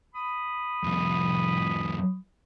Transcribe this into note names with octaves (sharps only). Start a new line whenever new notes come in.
B5 D#6
C2 F2